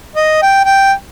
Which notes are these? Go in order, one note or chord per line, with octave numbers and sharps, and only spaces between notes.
D#5
G5
G5